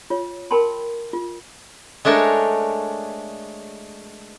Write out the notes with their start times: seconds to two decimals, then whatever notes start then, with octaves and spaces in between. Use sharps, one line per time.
0.10 F4 C#5
0.51 A#4 G5 A5 B5 C6
1.13 F4
2.05 G#3 A3 D4 A#4 C#5